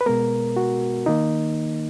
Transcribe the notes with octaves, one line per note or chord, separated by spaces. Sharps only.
B4
B2 G#3 B3 A#4
F#4
D#3 A#3 D#4